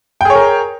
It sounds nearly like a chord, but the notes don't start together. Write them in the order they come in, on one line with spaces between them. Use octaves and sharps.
G5 G#4 C#5 A#4